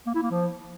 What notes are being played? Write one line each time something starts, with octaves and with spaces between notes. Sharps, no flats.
A#3
E4
A#3
F3